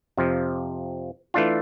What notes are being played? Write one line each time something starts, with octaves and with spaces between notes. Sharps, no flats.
F2 C3 F3
E3 A3 D4 F4